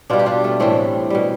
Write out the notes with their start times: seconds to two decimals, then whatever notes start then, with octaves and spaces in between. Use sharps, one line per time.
0.10 B2 G3 D4 F4
0.19 G4
0.26 D4 F4
0.44 A3
0.60 A2 E3 G3 A3 C4
1.10 B2 G3